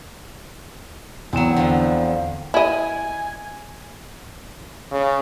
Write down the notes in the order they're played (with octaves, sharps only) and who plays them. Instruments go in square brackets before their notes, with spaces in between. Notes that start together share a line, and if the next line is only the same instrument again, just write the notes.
[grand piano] E2 G5 E7 [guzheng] F#3 C4
[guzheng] D3 F3
[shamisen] E4 D#5 [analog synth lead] G#5
[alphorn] C#3